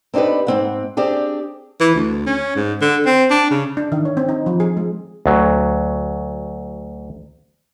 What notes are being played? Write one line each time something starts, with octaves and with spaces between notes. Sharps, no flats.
C4 D4 D#4 G4 B4
G#2 C4 F#5
C4 D4 G4 G#4
E3
D2
C#4
G#2
D3
C4
D4
C#3
D4
D#3
C#5
C4
D#4
F3
G#4
G#3
D2 F#3